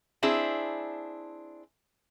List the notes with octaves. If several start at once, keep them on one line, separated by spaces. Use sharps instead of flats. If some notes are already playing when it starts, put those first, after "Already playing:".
C4 D4 E4 G#4